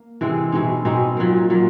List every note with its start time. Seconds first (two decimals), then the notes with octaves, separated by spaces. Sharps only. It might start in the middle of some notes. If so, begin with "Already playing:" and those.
Already playing: A#3
0.21 C3 E3 G#3 C4
0.52 B2 G#3 C4 D#4
0.85 B2 G#3 C4 D#4
1.17 A#2 F#3 A#3
1.50 A#2 F#3 A#3